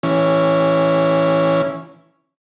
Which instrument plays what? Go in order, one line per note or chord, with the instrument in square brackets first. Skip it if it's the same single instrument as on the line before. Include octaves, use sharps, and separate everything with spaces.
[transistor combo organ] E3 C#4